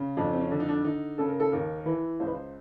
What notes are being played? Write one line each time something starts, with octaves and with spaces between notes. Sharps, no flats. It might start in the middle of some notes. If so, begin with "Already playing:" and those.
Already playing: C#3
F2 D4
C#4
C4
C#4
D3 D4
D#4
D4
D3 D#4
C#3 A4
A#4
A4
D#2 A#4
A#4
E3 B4
C#2 C5
B4
C5